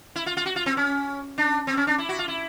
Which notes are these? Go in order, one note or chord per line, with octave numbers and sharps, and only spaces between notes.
E4
F4
F4
F#4
F4
C4
C#4
D4
C4
C#4
D4
E4
F#4
F4
E4